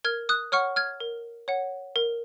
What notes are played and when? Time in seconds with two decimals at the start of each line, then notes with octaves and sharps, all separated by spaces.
0.04 A#4 F6 G#6
0.29 D#6 F#6
0.52 C#5 F#5 C#6 F6
0.76 F6 G#6
1.00 A#4
1.48 C#5 F#5
1.96 A#4